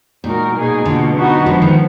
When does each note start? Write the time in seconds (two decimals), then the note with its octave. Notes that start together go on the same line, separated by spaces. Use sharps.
0.24 A#2 G#3 D#4 F#4 A#4
0.55 B2 A#3 D#4 G#4
0.85 B2 D3 A#3 F4
1.16 B3 D#4 F#4 B4
1.46 D3 F3 G#3 B3
1.62 D#3